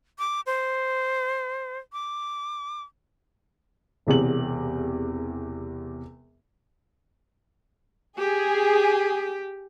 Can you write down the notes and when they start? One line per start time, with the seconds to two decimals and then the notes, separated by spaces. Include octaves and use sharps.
0.19 D6
0.46 C5
1.93 D6
4.07 E1 E2 C3 F#7
8.18 G4 G#4